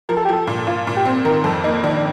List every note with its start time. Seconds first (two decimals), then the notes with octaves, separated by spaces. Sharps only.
0.09 F3 A#4
0.17 A4
0.25 G4
0.29 F3 A4
0.47 A#2
0.67 A#2 F4
0.87 A#2
0.96 G4
1.05 C4
1.25 D#3 A#4
1.44 F2 A4
1.64 A#3 D#4
1.83 D#3 D4
1.97 D4